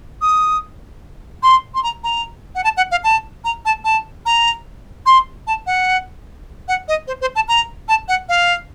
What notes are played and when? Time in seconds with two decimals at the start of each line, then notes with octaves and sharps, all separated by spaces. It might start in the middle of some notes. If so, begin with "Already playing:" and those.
0.21 D#6
1.43 C6
1.74 C6
1.83 A#5
2.04 A#5
2.55 F#5
2.64 A5
2.77 F#5
2.91 F5
3.04 A5
3.45 A#5
3.65 A5
3.84 A5
4.26 A#5
5.06 C6
5.47 A5
5.67 F#5
6.68 F#5
6.88 D#5
7.07 C5
7.21 C5
7.35 A5
7.48 A#5
7.88 A5
8.08 F#5
8.29 F5